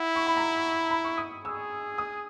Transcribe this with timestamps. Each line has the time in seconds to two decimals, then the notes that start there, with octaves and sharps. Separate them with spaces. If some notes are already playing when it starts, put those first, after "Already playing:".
Already playing: E4 F#5
0.16 C#6
0.27 B5
0.37 A#5
0.91 B5
1.04 C#6
1.18 D#6
1.44 G#4 E6
1.98 D#6